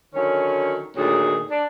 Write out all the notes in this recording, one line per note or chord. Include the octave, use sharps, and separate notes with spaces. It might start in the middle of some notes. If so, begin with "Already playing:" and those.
D3 D#3 F#3 C#4
D2 A#2 D#3 F#3 G#4
D4